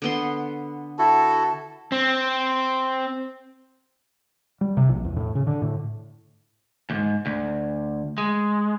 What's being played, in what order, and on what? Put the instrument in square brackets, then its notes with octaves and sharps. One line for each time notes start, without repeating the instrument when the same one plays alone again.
[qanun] D3 B3 C6
[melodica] E4 F#4 A4 [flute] A5
[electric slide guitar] C4
[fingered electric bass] G3
C3
A#1
E2
A2
C#3
D3
A2
[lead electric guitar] D#2 G#2
D2
G#3